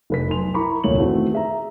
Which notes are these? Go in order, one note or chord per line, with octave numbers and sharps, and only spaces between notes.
F1 B4 B6
B1 G#5 C6 F7
E4 A#4 A#5 B5 C#6 D6
F1 D2 A#2 C#5 F#7
D#3 E3 A3 B3 C4 F#4
G#4 E5 A#5